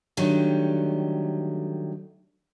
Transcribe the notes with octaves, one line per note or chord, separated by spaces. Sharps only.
D3 D#3 F#3 G3 A3 G4